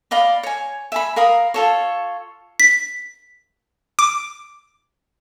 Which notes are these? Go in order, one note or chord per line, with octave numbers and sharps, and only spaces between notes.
D5 D#5 F5 B5
C#5 G#5
E5 G#5 B5
A#4 F5 B5 D#6
F4 A4 C#5
B6
D6